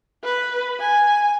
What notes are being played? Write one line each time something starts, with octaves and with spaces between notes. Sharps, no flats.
B4
G#5